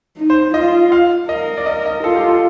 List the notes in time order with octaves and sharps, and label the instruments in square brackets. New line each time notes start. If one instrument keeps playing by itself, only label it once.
[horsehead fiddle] D#4
[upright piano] C5
[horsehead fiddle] F4 [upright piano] D#5
[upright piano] F5
[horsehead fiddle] A#4 [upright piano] D#5
[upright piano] D5
D#5
D#5
[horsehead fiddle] F4 [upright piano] A4
[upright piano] G4
A4